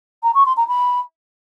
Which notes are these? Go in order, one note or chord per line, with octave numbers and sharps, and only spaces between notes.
A#5
C#6
C6
A#5
B5